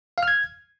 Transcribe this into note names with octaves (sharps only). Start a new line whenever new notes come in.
F5
F6
G#6